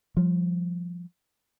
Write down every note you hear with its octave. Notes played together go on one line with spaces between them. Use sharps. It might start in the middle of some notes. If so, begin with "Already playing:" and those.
F3 G3